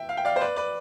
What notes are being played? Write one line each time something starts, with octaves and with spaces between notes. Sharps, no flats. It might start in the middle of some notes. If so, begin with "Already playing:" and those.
Already playing: E5 G5
F5
G5
D5 F5
C5
B4 D5
B4 D5